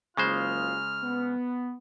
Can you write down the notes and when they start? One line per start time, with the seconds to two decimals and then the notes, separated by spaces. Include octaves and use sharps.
0.17 F#1 C#3 G#3 F4 C5 F6
1.02 B3